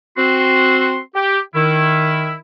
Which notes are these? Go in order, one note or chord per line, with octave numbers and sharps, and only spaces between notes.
C4 F#4 C6
G4
D#3 E4